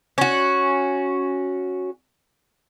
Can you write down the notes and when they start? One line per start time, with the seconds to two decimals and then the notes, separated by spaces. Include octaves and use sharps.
0.18 C#4 F#4